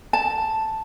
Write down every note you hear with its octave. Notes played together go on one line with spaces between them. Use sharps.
A5